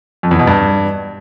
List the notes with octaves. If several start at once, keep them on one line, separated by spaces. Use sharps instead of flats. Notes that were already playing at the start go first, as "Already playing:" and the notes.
F2
E2
B2
G2